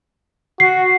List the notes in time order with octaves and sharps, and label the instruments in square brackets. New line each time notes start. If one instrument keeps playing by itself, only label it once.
[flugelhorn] F#4 [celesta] C7